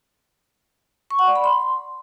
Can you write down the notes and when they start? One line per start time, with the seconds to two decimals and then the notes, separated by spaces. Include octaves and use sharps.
1.11 C#6
1.19 F#5
1.27 D5
1.36 B5
1.44 C6